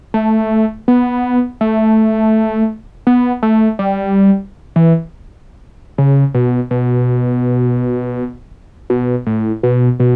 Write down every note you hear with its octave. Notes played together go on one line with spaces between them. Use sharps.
A3
B3
A3
B3
A3
G3
E3
C#3
B2
B2
B2
A2
B2
B2